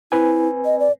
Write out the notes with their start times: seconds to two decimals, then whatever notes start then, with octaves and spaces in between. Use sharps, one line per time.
0.12 C4 E4 B4 G#5
0.65 D#5
0.80 D5